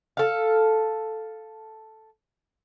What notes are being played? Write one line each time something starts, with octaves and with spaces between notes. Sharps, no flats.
A4 F5